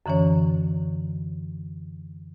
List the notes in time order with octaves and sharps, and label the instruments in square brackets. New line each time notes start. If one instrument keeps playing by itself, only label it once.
[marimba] F#2 D3 E3 C#4 C#5